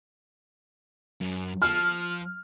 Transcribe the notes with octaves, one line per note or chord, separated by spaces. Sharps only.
F#2
F3 F6